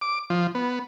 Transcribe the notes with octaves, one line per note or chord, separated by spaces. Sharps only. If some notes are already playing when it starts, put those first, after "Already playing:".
D6
F3
B3